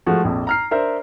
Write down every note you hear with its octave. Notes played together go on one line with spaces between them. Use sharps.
F3 G#3 A3 F#4
A#1 F2
A#5 F6 C7
D4 A#4 C5 E5